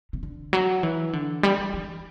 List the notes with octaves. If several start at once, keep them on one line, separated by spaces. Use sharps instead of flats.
C3
D3
F#3
E3
D3
G3
G3
E3